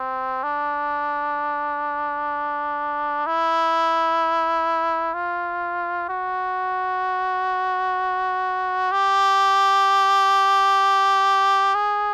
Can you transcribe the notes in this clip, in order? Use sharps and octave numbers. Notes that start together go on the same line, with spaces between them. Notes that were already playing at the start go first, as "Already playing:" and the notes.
Already playing: C4
D4
E4
F4
F#4
G4
G#4